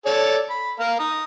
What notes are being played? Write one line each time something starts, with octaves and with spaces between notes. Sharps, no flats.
A4 C#5 D5
B5
A#3 A#4 F5
A#5 D#6